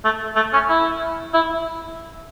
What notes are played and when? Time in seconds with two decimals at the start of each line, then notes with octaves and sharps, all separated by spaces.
0.05 A3
0.36 A3
0.53 C#4
0.69 E4
1.34 E4